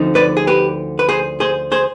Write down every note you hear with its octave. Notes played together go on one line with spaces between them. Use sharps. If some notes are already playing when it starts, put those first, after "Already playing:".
Already playing: D2 D3 F3 C4 D#4
B4 D5
G#4
G4 B4
B4
G#4 C5
G#4 C5
G#4 C5